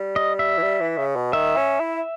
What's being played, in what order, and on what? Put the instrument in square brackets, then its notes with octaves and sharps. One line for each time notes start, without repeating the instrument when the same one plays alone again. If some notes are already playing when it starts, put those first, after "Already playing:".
Already playing: [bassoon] G3
[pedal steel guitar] D#5
E5
[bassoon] E3
G3
E3
C#3
B2
[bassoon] D#3 [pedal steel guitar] E5
[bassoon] C#4
E4